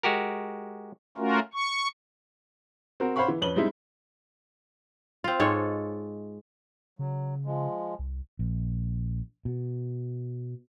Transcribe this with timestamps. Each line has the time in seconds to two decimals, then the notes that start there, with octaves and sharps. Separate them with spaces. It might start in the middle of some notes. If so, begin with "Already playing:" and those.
0.03 G#3 F#4 G4 A#4
1.17 A3 C#4 F4 F#4 A#4
1.54 C#6
3.00 C4 F#4 A#4
3.16 C5 C#5 F5 F#5 B5 C#6
3.28 E3
3.42 F2 C#4 B4 F#7 G7
3.56 G3 G#3 C4 D#4 E4
5.24 C4 F4
5.40 G#2 G#3 A4 C#5
6.99 C#3 F#3
7.45 F3 G#3
7.99 C2
8.39 A#1
9.45 B2